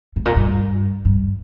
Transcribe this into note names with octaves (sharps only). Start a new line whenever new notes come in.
A2
A#2
G2
G2